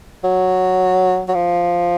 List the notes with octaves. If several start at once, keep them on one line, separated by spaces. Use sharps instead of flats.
F#3
F#3
F3